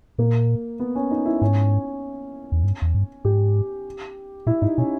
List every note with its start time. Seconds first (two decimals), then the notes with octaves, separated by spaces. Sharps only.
0.18 A#2 A#3
0.80 B3
0.95 C#4
1.11 D#4
1.25 E4
1.42 G#2 C#4
2.52 E2
2.63 G2
2.82 E2
2.95 G2
3.25 G#2 G4
4.47 A#2 E4
4.62 G#2 D#4
4.78 B2 C#4